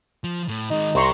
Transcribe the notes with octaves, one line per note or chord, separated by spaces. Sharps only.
F3
A2
D#3 G#3 D#4
C2 C4 G4 A#5 C6 C#6